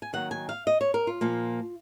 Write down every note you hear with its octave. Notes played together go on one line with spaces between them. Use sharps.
G#5
D#3 F#3 A#3 F#5
G#5
F5
D#5
C#5
A#4
F4
A#2 F3 A#3